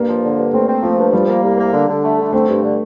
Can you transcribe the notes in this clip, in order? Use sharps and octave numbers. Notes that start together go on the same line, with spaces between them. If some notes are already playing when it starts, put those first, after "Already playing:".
Already playing: G2 A#3
F3
D3
G2
A3 C4
C4
F3 A3
G2
F3 G3
A#3
C2
A#3
D3
D3
A3
D3
A3 C4
G2
D3